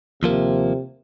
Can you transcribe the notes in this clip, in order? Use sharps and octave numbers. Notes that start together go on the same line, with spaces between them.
D#2 C3 F3 A#3